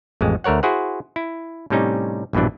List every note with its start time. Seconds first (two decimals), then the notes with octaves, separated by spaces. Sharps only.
0.21 A1 F2 G#3
0.44 D2 A3 A#4 C#5 F#5
0.63 E4 F#4 G#4 C5 F#5
1.16 E4
1.70 A2 C3 G3 C#4 D#4
2.33 A#1 G2 B2 E3 D4